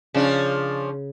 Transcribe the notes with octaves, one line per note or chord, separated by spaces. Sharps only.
C#3 F3 C#4 D4